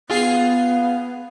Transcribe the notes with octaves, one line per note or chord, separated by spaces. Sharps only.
B3 F4 G#4